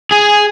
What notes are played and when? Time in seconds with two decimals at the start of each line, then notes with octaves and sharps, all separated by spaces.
0.12 G#4